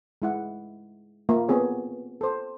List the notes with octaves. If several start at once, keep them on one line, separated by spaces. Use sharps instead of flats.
G#3 E4 F#5
A#3 F4
B3 C4 G#4 C#5
A4 C5